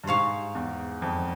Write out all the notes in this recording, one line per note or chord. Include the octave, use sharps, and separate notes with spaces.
G2
G#2 C5 F5 G#5 C#6
E2
F2